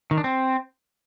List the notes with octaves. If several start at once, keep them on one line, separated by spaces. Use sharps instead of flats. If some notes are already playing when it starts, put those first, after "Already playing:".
D#3
D4
C4